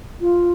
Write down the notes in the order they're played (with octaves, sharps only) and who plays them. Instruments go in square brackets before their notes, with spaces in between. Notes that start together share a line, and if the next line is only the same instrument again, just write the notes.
[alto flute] F4